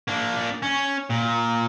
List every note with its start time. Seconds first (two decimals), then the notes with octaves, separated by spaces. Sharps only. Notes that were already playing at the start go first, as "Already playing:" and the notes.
0.08 A#3 D4
0.63 C#4
1.10 A#2